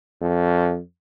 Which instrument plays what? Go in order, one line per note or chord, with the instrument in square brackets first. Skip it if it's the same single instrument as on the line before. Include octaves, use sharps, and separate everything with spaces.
[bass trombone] F2